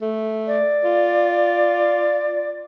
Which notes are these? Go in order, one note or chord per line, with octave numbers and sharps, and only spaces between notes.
A3
D5
F4